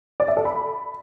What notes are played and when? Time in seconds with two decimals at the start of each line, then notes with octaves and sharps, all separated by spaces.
0.20 D5
0.28 E5
0.37 A4
0.45 B5